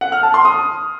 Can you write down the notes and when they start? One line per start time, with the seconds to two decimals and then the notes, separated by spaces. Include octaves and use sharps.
0.01 F#5
0.12 F6
0.23 A5
0.34 C6
0.45 D#6